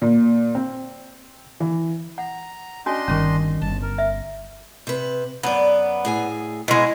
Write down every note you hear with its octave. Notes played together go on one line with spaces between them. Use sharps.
A#2
C4
E3
F#5 A#5
C#4 D4 F#4 D#5 G#5 C6
G1 A#2 D#3 C#4 C#6
G1 A5
A#4
E5
C3 B4
F#2 B3 D5
A2 G#4 G#5
B2 F#3 G#3 E4